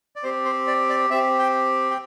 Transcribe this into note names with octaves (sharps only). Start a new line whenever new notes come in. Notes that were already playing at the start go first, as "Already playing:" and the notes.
D5
C4 G4 C5
C5
D5
D5
C4 G4 E5
G5
G5